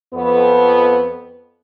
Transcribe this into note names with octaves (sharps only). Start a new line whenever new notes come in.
F2 B3